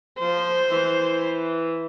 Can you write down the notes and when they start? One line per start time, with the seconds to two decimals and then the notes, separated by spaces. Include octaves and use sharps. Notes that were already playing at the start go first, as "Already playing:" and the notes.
0.19 F3 C5
0.71 E3